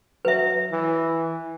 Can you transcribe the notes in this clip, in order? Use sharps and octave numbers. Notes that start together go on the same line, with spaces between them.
F#3 B4 E5
E3